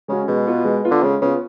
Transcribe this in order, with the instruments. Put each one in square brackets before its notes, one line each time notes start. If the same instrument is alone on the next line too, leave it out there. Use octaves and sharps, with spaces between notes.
[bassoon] C#3 [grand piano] G#3 C#4 F#4
[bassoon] B2 [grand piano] G#3
[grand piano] B3 F4
G#3
B3 F4
[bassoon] D3
[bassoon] C#3 [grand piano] G#3
[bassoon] C#3 [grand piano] B3 F4